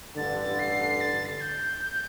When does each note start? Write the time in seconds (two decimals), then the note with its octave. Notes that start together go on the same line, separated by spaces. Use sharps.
0.17 A1 G2 D3 A6
0.59 C7
1.00 A6
1.25 C7
1.32 A6
1.40 G6